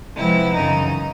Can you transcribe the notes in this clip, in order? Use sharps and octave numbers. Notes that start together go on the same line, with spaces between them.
C3 F3 G#3 B3 E4
F#2 C#3 E3 D#4